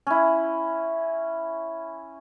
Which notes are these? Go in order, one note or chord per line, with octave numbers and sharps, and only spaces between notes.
C#4 E4